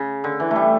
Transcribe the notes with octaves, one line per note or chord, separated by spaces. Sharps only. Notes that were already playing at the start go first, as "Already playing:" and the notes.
Already playing: C#3
D3
E3
G3 A3